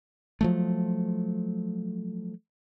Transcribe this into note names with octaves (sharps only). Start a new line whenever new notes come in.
F3 F#3 A3